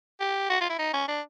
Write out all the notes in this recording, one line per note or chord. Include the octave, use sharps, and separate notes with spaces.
G4
F#4
F4
E4
D#4
C#4
D4